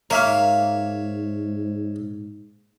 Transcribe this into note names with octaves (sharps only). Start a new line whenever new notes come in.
G#2 A#3 C#5 E5 F5